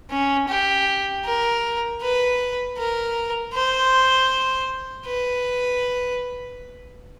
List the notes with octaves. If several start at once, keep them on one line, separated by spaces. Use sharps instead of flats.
C#4
G4
A#4
B4
A#4
C5
B4